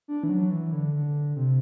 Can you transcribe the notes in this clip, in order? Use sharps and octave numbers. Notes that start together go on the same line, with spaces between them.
D4
E3
F#3
E3
D3
D3
C3